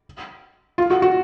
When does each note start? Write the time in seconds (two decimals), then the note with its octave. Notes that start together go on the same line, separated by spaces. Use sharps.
0.78 F4
0.90 F#4
1.02 F#4